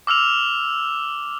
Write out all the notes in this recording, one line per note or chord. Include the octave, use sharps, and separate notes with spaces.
D6 E6 F6 F7